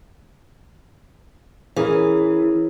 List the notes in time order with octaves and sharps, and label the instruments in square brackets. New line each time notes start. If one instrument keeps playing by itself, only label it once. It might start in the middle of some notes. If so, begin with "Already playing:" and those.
[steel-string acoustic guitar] E3 [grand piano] C#4 G#4 A#4